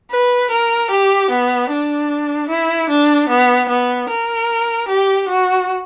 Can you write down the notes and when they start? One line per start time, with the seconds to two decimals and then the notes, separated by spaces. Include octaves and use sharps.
0.11 B4
0.51 A#4
0.91 G4
1.30 B3
1.70 D4
2.49 E4
2.90 D4
3.29 B3
3.69 B3
4.09 A#4
4.88 G4
5.29 F#4